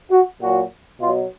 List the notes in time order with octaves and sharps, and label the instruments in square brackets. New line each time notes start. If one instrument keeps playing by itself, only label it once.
[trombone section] F#4
A#2 F#3 F#4
B2 F#3 F4